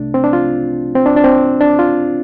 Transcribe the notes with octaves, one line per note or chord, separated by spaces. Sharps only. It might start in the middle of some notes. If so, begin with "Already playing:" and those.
Already playing: C2 C3 A3 D4
C4
D4
F4
C4
D4
D4
C4
D4
F4